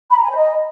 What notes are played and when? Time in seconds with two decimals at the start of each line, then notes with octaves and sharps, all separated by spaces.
0.10 B5
0.16 A#5
0.23 G#5
0.29 C5
0.36 D#5